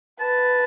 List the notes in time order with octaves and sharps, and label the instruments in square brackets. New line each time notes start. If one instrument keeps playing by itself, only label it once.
[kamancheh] B4 [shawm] A5